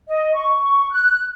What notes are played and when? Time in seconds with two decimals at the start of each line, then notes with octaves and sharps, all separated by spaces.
0.09 D#5
0.34 C#6
0.91 F#6